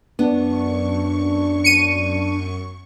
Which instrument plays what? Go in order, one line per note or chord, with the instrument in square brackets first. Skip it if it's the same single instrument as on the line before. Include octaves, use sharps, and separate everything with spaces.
[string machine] F#2 C#6 [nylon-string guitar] B3 [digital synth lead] D4
[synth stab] C#7 D#7